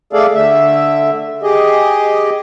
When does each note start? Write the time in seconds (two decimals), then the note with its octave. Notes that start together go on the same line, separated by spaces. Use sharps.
0.13 A3 G#4 A4 D5 F5
0.34 D3 A3 E5
1.43 G4 G#4 D#5